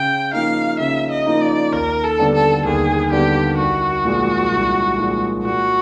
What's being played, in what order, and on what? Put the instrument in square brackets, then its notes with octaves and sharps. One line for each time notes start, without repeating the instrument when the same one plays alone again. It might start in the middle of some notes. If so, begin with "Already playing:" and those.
Already playing: [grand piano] C#3 [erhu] G5
[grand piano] F3 A#3 D#4 [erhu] F5
[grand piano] C#3 [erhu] E5
[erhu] D#5
[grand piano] F3 A#3 D#4
[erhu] D5
[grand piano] D#2 [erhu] A#4
[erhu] A4
[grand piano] D3 G3 B3 D4
[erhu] A4
[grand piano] D#2 [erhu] G#4
[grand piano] D3 G3 B3 D4 [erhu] G4
[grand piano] C2 [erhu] F#4
[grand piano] A#2 F3 G#3
C2
A#2 F3 G#3
[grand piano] A#2 [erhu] F#4